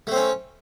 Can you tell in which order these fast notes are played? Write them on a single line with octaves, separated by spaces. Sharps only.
A3 C4 C#4